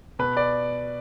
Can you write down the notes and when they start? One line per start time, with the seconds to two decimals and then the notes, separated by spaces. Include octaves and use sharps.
0.19 B2 B4
0.37 D5